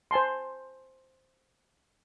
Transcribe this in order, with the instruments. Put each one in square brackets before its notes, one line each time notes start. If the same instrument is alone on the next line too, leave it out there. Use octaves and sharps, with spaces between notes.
[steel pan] C5 G#5 A5 C6